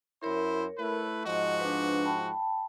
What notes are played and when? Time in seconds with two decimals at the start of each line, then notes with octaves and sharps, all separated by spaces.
0.23 F#2 E4 A#4 C5 C#5
0.78 A3 E4 B4
1.26 G#2 F3 F#4 D#5
1.60 D4 B4
2.05 G5 A5 B5